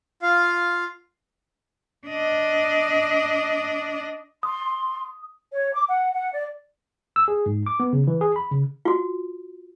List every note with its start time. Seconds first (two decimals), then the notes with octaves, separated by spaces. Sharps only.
0.23 F4 F5
2.07 D4 D#5
4.43 C6 D#6
5.52 C#5
5.74 D6
5.88 F#5
6.14 F#5
6.33 D5
7.16 E6
7.28 G#4
7.46 G#2
7.66 D6
7.80 B3
7.93 C#3
8.07 E3
8.21 G#4
8.36 B5
8.51 C#3
8.85 F4 F#4